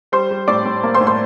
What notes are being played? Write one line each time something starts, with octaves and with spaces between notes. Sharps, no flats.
G3 C5 C6
G3
A2 D5 D6
A2
A#3
C5 C6
A2
C5 C6